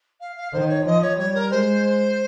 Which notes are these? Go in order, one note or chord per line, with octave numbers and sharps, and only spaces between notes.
F5
F5
D#3 C5
C#5
F3 D#5
C#5
G3 C#5
A#4
G#3 C5